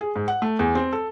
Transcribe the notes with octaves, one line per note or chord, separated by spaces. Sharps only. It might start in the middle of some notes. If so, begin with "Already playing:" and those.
G#4
G#2
F#5
A3
E2
C4
A4